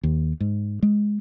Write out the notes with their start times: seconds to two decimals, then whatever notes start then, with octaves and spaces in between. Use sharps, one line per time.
0.03 D#2
0.40 G#2
0.83 G#3